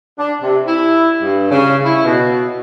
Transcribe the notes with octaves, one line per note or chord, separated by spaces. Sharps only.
D4
C3
E4
G2
C#3
E4
B2